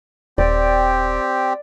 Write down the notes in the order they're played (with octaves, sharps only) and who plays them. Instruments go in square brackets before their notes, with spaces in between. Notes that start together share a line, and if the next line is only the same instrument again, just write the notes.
[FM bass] D#1 [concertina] C4 G4 [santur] D5